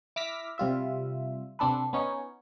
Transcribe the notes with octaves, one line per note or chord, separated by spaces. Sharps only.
E4 D6 E6 F6 A#6 B6
C3 G3 F4 E5
C3 C4 D4 A4 B4
B3 C#4 D#4 C#5